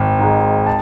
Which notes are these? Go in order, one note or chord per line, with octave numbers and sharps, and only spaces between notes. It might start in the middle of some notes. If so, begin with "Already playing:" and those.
Already playing: G#1
G#2 G#3
A5